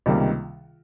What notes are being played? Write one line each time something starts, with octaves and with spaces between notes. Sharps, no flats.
C#2 C3 D#3 G3 A#3